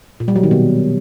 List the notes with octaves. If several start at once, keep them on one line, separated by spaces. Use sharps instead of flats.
A#2
G3
F#3
D#3
B2